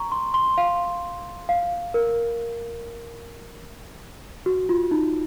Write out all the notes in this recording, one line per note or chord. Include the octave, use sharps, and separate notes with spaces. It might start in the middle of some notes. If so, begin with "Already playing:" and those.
Already playing: A#5 C#6
C6
C6
F5
F5
A#4
F#4
F4
D#4